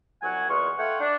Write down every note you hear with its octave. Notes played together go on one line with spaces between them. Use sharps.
C2 F#3 F#5 G#5
E2 G#3 F4 C#6
A3 F4 C#5 F#5 G5
D4